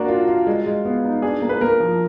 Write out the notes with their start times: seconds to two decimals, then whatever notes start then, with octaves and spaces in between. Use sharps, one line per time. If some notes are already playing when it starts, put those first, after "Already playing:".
Already playing: A#3 D4 F#4
0.08 F4
0.28 F4
0.47 G#3
0.66 G#3
0.85 B3
1.04 D#4
1.22 D4 G#4
1.42 A#3
1.49 B4
1.61 A#3 A#4
1.80 F3